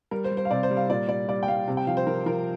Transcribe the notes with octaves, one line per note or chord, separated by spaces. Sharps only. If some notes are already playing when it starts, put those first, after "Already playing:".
G3 A#4
C5
G3
C5
F5
C3 D5
C5
G3
F5
A#2 D5
G3 D5
G3 D5
G5
G3 F5
C3
G5
F3 F5
C5
F3 A#4
F3 A#4